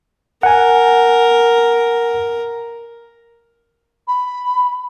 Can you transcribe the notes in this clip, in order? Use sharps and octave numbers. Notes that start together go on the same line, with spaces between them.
A#4 F#5 G#5
B5